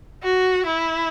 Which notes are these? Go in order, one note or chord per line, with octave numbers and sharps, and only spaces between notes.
F#4
E4